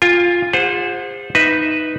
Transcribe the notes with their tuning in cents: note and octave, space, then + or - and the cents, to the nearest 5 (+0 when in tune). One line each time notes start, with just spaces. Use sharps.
F4 +0 G#5 -45
G#4 -35 C5 +0 F#5 -30
D#4 +0 B4 +0 E5 -15